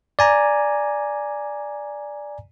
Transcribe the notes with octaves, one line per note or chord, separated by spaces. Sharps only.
D5 G#5 A#5